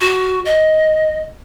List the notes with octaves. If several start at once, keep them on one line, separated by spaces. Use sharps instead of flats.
F#4
D#5